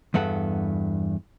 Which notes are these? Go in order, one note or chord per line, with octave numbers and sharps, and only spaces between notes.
E2 G2 B3 A4 F#5